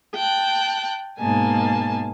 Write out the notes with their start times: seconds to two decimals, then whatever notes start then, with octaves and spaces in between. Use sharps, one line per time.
0.14 G5 A5 F#6
1.19 G#2 B2 A#3 G#5 A5